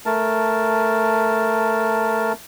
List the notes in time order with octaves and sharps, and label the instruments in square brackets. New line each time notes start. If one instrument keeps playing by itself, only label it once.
[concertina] A3 A#4 A5